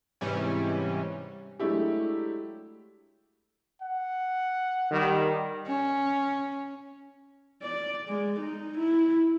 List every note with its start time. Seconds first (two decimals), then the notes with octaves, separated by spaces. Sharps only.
0.21 G#2 C3 E3 G3 C#4
1.59 F#3 G#3 A3 D4 E4 G4
3.82 F#5
4.91 D#3 G3
5.67 C#4
7.62 D5
8.08 G#3
8.40 D#4
8.78 E4